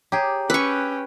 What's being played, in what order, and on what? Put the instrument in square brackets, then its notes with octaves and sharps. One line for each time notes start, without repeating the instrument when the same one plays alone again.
[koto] G4 G#4 [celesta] C#5 A#5 D6
[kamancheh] C#4 G5 [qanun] B4 C#6 [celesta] D6 E6 F#6